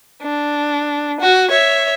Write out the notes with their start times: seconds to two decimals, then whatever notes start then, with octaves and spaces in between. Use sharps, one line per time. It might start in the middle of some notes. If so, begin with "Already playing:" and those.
0.22 D4
1.20 F#4
1.51 C#5 E5